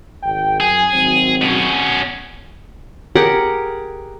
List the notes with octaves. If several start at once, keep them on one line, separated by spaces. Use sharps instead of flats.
G#1 G5
F#2 G#4 G#5
G#1 F#3 C4
B2 C#4
G4 G#4 A#4 F#5